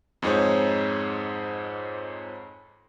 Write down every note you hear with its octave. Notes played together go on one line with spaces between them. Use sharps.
F2 G#2 D#4 G#4 C5 C#5